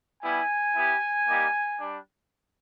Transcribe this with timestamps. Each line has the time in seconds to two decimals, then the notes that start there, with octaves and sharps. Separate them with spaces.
0.22 G3 B3 E4 G#5
0.76 B3 E4 G4
1.28 G3 A#3 D#4 G4
1.80 G3 D4